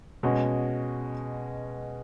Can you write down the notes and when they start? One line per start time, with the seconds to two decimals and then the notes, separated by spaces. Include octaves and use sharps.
0.23 B2 G#3 C#4 F#4